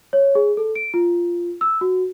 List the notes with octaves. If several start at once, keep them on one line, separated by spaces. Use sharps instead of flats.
C#5
G#4
A4
D7
F4
E6
F#4